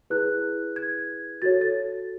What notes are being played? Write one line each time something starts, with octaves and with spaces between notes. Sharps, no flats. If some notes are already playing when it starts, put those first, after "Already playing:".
E4 G#4 B4 F#6
G#6
F#4 A4 C#5 A6
A6